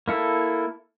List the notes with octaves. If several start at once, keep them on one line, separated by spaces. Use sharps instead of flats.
A#3 E4 A4